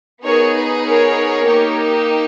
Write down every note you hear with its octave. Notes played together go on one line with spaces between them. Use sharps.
B3 D#4 G#4 A#4 C#5
B4
A#4 C#5
A#3 D#4 G4